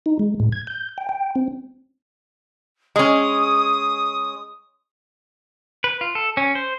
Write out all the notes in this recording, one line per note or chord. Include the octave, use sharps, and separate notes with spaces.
D#4
G#3
A2
G#6
G6
G5
G5
C4
G#3 C#4 D#6
B4
F4
A4
C#4
C5